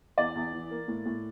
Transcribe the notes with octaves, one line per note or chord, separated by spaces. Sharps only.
E2 D5
E2
E3
A#3
A2
A2